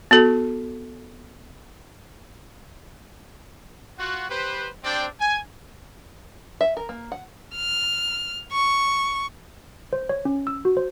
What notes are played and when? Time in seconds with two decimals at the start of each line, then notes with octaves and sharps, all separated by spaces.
0.11 B3 F#4 A4
3.98 F4 F#4 F#5
4.29 G4 B4 C5
4.84 G3 C4 D4 C5 D5 G5
5.20 G#5
6.61 E5
6.77 A#4
6.89 A#3
7.12 F#5
7.56 F6
8.52 C#6
9.93 C5
10.09 C#5
10.25 C#4
10.47 E6
10.65 F#4
10.77 C5